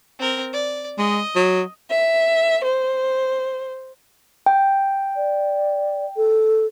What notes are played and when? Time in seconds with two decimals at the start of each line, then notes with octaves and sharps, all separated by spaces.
0.19 C4 A#4
0.53 D5
0.98 G#3 D#5
1.35 F#3
1.91 E5
2.66 C5
4.46 G5
5.16 D5
6.17 A4